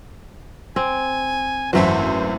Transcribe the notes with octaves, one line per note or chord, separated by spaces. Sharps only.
C4 G#5
G#1 F#2 E3 F#3 A3 E4 C5